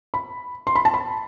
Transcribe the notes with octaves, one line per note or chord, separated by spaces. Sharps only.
B5
C6
B5
A5
B5